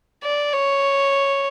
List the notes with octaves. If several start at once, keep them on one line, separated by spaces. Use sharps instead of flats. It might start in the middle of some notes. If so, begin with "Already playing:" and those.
D5
C#5